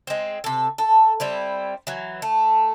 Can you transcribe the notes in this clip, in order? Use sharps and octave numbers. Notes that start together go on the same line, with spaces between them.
G#3 C4
C3 A4
A4
G3 C4 E4
E3 F#3
A3